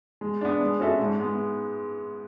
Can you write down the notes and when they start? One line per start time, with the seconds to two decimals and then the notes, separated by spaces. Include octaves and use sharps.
0.21 G#3
0.41 B3 D4
0.61 G#3
0.80 C#4 F#4 A4 E5
1.00 G#2
1.20 G#3 B3